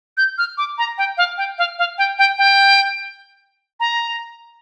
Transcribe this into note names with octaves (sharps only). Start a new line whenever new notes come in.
G6
F6
D6
A#5
G5
F5
G5
F5
F5
G5
G5
G5
A#5